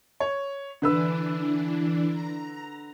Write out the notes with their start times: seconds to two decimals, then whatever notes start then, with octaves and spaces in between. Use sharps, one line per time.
0.20 C#5
0.82 D3 E3 D4 B4 E6
2.10 A#5